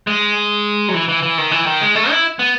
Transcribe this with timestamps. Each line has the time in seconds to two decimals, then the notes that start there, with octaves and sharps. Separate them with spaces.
0.07 G#3
0.88 F#3
0.94 E3
1.08 E3
1.23 E3
1.38 D#3
1.51 E3
1.66 D#3
1.81 G#3
1.95 A3
2.10 E4
2.39 B3